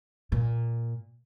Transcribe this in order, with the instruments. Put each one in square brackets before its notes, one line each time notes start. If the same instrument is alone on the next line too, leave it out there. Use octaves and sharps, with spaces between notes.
[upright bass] A#2